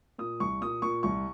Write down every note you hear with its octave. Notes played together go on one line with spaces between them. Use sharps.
A#2 D#6
C2 C#6
A#2 D#6
A#2 C#6
C2 C#6